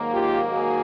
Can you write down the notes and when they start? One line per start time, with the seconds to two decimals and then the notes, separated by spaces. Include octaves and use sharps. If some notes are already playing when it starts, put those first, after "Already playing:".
Already playing: G#2 D#3 F#3 A#3
0.13 F4 G4
0.51 F#4 G#4